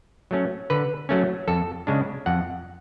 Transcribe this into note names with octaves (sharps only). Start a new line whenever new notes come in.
F#3 A3 C#4
D3 B4
F#3 A3 C#4
F2 A4
C#3 G#3 D4
F2 F#5